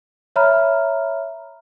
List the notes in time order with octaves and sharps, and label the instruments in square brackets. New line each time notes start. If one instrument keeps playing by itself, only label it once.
[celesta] C#5 E5 A#5 B5 F6